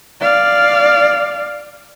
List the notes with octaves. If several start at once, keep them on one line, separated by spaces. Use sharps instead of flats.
D5 F5